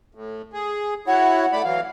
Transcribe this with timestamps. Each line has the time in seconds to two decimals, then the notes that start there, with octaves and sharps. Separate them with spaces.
0.15 A2
0.53 G#4
1.07 E4 F#4 C#5 F#5
1.53 A3 D5 B5
1.64 E3 F#3 F5